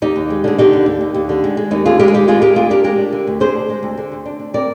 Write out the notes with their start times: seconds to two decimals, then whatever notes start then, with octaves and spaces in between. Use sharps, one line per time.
0.02 D#2 D#4 G4
0.16 D#2
0.30 G#3
0.44 D3 G#4
0.58 D3 D#4 G4
0.73 D#2
0.86 D#2
1.01 D#2
1.14 D#2
1.29 D3
1.44 G#3
1.57 G#3
1.71 D#2 D#4
1.85 D3 F4 G#4
1.99 G#3 G4 A#4
2.08 G#4
2.14 D#2 D#4 G4
2.28 G#3 F4 G#4
2.42 G#3 G4 A#4
2.56 D2 F4 G#4
2.70 D4 G4 A#4
2.84 G#3 G4 A#4
2.98 D4
3.12 D3
3.27 D2
3.40 D3 G#4 C5
3.55 D4
3.70 G#3
3.83 D2
3.97 D3
4.12 D2
4.26 D4
4.39 D4
4.54 C4 A#4 D5